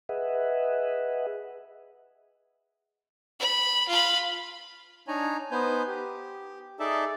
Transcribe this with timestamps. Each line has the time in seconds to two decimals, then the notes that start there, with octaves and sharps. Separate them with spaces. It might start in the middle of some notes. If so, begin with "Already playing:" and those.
0.09 G#4 B4 D#5 E5 F#5
3.40 B5
3.88 F4 B5
5.08 D4 D#4 C#5 G#5 A#5
5.51 B3 D#4 B4 C5 G#5 G6
5.87 G4
6.80 D#4 G#4 A4 D5 E5 A5